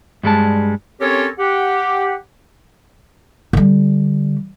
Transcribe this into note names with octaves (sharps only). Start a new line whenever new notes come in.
G2 G3 G#3 A5
C4 C#4 G4 A4 A#4 C#5
G4 F#5
D3 G3